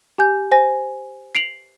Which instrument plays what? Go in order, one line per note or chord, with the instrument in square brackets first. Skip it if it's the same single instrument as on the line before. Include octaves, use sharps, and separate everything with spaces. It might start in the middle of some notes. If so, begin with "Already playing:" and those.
[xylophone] G4 G#5 G6
C5 G#5 A#6
C7 D7 F7 F#7